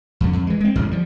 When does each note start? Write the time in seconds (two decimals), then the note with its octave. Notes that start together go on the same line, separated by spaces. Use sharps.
0.20 F2 D3
0.33 F2
0.47 E3 G#3
0.61 G#3 C4
0.76 A1 F#2 D3 G#3
0.91 F3 G3